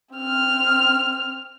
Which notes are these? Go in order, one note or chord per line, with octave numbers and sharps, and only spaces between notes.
C4 F6